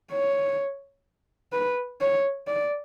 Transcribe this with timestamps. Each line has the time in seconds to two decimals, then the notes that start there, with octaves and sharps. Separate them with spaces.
0.12 C#5
1.53 B4
2.01 C#5
2.47 D5